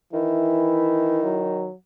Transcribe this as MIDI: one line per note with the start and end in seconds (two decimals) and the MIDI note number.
0.13 1.66 51
0.13 1.19 52
0.13 1.59 64
1.24 1.74 54